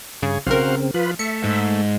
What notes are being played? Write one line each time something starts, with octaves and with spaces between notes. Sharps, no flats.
G2 C#3 G#4 C#5
B1 C#3 C4 F#4 A#4 C5 F5
F3 F4 B4 B5
A3 E5 C#7
G#2